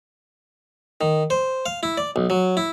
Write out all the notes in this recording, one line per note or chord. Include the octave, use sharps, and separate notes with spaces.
D#3
C5
F5
E4
D5
B1
F#3
E4